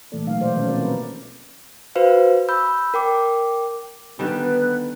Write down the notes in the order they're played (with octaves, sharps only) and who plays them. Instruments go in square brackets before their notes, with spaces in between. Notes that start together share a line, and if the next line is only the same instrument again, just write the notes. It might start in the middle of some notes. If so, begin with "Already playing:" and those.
[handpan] A#2 E3 A3 A#3 A4 D5
B2 F#3 A3 A#3 D#4 F5
G#3 C5 D5
B2 D#3 F3 G#3 A#3 C#4
C4 C#4 F#4 A#4 C5 D5
C#4 E4 B4
[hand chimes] F#4 B4 C5 F5
B5 E6 G6
A#4 G5 D6
[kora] D3 D#3 G3 [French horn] B3 [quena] B4